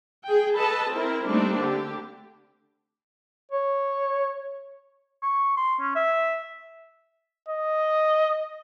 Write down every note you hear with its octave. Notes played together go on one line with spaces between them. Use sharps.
G#4 G5
A4 B4 D#5 A5
C4 E4 A#4
G3 A3 A#3 C4 D4 D#4
D3 G4
C#5
C#6
C6
C#4
E5
D#5